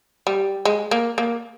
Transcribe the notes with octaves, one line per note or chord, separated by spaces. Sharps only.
G3
G#3
A#3
A#3